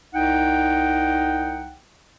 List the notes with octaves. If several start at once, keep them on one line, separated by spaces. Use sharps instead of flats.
C2 D#4 F#5 G5